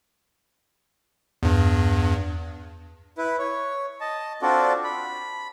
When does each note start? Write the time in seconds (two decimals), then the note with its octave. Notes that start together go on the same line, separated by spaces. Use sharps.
1.43 E2 G2
3.18 E4 B4
3.39 C#5
4.01 D#5 A5
4.42 C4 D4 F4 F#4 A4 D5
4.84 B5